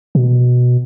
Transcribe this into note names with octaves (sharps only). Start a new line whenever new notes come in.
B2